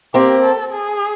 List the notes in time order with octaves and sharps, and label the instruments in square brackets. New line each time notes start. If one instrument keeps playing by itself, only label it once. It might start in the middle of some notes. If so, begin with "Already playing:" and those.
[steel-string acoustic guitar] A#3 C4 [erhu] G4
[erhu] A4
G#4